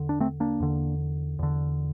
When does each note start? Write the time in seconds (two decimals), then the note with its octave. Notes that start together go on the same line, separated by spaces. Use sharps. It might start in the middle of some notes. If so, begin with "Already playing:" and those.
Already playing: E2 D3
0.09 D4
0.20 A3 C4
0.40 A#3 D4
0.60 E2 D3
1.39 E2 D3